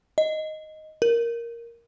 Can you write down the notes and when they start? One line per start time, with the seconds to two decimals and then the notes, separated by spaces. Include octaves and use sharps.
0.18 D#5
1.02 A#4